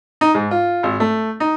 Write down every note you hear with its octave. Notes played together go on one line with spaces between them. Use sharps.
D#4
G#2
F4
G#1
A3
D#4